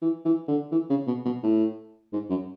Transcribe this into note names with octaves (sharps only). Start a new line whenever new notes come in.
E3
E3
D3
E3
C#3
B2
B2
A2
G#2
F#2